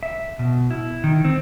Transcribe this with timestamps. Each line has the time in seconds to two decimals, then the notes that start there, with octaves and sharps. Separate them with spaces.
0.03 E5
0.39 B2
0.71 E4
1.04 D#3
1.25 C4